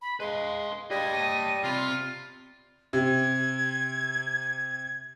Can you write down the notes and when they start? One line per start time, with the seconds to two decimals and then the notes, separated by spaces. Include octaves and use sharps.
0.02 B5
0.20 G#3 B4 F5 C6
0.91 G3 B4 D#5 F5 G#6
1.13 C#5 A5 D#7
1.64 C3 C4 F4 B5
2.93 C3 G#6